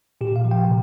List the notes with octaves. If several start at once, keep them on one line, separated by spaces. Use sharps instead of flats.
A#2 G4
F5
F3
G5
C3